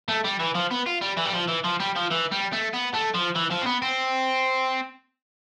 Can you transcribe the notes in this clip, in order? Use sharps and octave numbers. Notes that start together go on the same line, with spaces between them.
A3
G3
E3
F3
B3
F4
G3
E3
G3
F3
E3
F3
G3
F3
E3
G3
A3
B3
A3
F3
E3
F3
C4
B3
C4